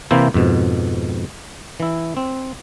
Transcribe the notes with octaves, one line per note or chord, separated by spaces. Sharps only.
C3 E3 A#3 E4 C5
F2 G#2 B2
E3 E4
C4